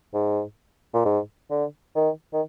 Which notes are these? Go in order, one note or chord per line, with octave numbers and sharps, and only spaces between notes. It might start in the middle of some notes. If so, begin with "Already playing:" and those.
G#2
A#2
G#2
D3
D#3
D#3